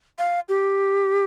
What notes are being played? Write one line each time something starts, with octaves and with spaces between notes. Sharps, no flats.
F5
G4